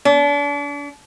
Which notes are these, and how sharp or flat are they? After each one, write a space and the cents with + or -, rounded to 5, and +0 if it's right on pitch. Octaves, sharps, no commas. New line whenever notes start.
D4 -35